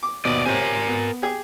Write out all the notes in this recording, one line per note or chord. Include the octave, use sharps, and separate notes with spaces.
D6
D#2 B2 B3 D5 D#5
C3 A#4 C5 C#5 G#5
B3
G4 G#4